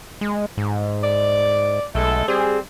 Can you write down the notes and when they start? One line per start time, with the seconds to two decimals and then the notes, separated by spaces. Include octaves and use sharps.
0.21 G#3
0.57 G#2
1.04 D5
1.95 B1 G#3 A3 A4
2.28 G3 C4 G#4